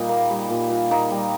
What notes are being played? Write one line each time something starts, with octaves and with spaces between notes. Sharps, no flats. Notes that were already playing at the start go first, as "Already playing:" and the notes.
Already playing: A#2 G3 D#4
A#3
G3
A#2
A#2
A#3 D#4
G3